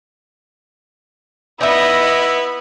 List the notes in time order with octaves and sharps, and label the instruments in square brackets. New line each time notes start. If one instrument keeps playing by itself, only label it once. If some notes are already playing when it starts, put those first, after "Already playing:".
[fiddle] B3 [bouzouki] D#4 E5 [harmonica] E4 [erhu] D#5